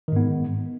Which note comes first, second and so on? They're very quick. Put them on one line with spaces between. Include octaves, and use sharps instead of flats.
D#3 G#2 B3